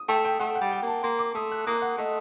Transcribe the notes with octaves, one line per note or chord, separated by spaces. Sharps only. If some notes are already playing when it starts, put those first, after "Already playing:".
Already playing: D#6
A3 G5
G5
A3 F#5
F#5
G3
G5
A#3 A5
A#3 C6
D6
A3 D#6
F#6
A#3 D#6
F#5
A3 D#5